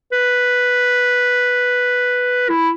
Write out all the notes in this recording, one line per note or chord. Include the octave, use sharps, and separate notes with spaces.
B4
E4